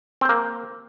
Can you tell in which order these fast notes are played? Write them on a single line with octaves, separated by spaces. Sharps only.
C4 C5 A#3